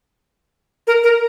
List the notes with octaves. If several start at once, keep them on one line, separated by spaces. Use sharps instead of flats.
A#4
A#4